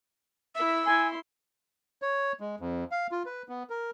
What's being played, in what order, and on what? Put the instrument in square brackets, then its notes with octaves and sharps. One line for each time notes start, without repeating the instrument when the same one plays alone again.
[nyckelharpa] E4 E5 [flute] E6
[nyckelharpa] E4 C6 [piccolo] G#5
[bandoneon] C#5
G#3
F2
F5
F4
B4
B3
A#4